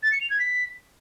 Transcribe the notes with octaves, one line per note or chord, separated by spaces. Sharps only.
A6
C#7
F7
G#6
B6